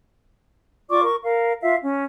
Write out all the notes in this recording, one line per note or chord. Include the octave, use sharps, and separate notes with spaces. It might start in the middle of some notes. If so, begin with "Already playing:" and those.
F4 D5 C#6 D6
A#4 C#6
A#4 F5
F4 E5 F5
C#4